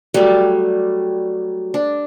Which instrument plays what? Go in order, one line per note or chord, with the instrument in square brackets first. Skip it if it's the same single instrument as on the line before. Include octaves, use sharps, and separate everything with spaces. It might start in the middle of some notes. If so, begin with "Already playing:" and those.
[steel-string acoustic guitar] F#3 [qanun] G3 A3
[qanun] D4